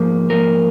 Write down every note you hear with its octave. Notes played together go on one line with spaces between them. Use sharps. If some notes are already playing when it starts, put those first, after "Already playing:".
Already playing: G#2 F3 A#3
G#2 F3 A#3 A#4